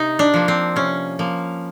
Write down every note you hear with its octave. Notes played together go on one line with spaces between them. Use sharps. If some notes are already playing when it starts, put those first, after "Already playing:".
Already playing: C3 D#4
D4
F3 A#3
C4
C3 C#4
F3 A#3